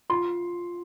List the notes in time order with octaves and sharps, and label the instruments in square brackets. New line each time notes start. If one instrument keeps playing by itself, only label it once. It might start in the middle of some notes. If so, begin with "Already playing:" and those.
[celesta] F4 [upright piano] C6